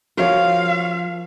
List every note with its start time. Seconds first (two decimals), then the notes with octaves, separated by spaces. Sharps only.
0.17 F3 F#4 A#4 C#5 F5